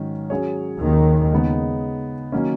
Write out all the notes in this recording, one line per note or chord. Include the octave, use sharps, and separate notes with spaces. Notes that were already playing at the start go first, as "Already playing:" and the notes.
Already playing: G#2 D#3 F#3 C#4
F#3 C#4 G#4 C#5
D#2 D#3
C#3 G#3 B3 D#4
D#3 F#3 A#3 C#4